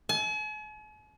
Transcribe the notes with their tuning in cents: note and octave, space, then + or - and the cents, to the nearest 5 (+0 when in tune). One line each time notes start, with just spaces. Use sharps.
G#5 +45